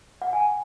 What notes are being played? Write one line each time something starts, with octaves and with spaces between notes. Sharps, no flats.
F#5
G#5